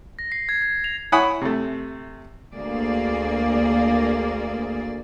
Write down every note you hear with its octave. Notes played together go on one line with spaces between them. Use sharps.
A#6
C7
G#6
G#6
F7
E4 C#5 F#5 G#5 B5 D#6
C3 A3
D2 A#3 G#4 D5